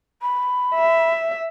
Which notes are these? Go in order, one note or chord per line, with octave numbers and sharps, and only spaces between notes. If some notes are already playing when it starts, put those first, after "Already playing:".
B5
E5